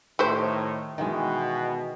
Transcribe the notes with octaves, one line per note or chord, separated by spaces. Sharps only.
A2 D#3 A3 G4 C5
B2 D#3 E3 G#3